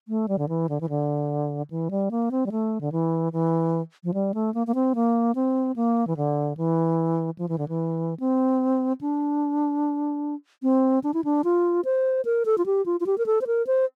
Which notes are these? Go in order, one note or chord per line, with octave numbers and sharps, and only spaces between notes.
A3
G3
D3
E3
D3
E3
D3
E3
G3
A#3
C4
G3
A3
D3
E3
E3
F3
G3
A3
A#3
A#3
C4
A#3
C4
A#3
E3
D3
E3
F3
E3
D3
E3
C4
D4
C4
D4
E4
D4
F4
C5
A#4
A4
F4
G4
F4
F4
G4
A#4
A4
C5
A#4
C5